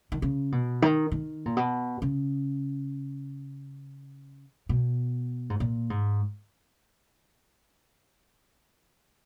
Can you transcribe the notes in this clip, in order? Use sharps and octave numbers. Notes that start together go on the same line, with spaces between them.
D#3
C#3
B2
D#3
D#3
A#2
B2
C#3
B2
G#2
A#2
G#2